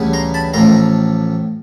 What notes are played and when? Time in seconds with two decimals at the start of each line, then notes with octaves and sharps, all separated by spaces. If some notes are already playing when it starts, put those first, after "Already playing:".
Already playing: D2 C#3 E3 G3 B3
0.13 A#5 C6
0.34 A5 B5
0.54 A1 A2 F3 A#5 C6